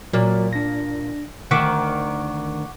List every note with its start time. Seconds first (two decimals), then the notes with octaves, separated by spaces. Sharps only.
0.13 A#2 F#3 A#4 D5
0.53 D4 A#6
1.51 D2 D#3 E5 F#5 C#6 D6